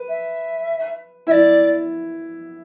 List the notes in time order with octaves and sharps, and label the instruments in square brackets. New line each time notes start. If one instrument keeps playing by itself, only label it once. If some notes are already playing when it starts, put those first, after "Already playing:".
Already playing: [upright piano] B4
[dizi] E5
[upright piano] E4 [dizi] E5
[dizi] D5